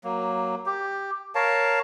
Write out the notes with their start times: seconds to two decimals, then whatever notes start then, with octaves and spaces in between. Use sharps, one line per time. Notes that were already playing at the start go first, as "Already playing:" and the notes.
0.04 F#3 A#3
0.66 G4
1.35 A#4 C#5 F5 A5